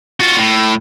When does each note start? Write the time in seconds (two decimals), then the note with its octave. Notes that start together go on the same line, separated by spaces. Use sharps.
0.20 F4 F#4
0.38 A2